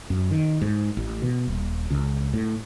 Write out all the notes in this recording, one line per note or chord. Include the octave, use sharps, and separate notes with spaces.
F#2
D#3
G#2
A1
B2
D#1
C#2
A2